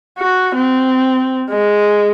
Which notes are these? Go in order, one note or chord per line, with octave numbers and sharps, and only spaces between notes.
F#4
C4
G#3